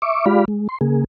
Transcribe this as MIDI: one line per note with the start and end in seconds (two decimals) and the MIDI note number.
0.02 0.25 76
0.02 0.25 85
0.02 0.25 86
0.26 0.45 56
0.26 0.45 65
0.26 0.45 67
0.26 0.45 74
0.26 0.45 77
0.26 0.45 83
0.48 0.68 56
0.69 0.78 84
0.81 1.04 49
0.81 1.04 58
0.81 1.04 68